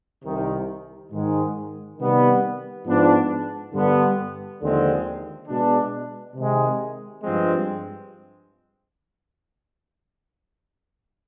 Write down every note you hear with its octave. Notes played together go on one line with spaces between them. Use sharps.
C2 C3 D#3
G#2 D#3 G#3
C3 D#3 G3 B3
G#2 F3 B3 D4
G2 D3 G3 B3
D#2 D3 F3 G#3 C4
B2 G#3 D4
C3 D#3 G#3
G2 F3 G#3 C4